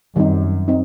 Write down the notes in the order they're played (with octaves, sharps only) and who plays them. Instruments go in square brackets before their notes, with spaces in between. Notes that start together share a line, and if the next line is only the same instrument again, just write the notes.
[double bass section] F#2 [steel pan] D#3 G3 C4 D#4
[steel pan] C4 D#4